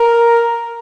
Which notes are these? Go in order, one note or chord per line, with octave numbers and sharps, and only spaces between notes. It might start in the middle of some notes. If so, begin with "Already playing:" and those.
Already playing: A#4